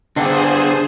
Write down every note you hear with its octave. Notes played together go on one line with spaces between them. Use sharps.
D3 B3 D4 G#4 C5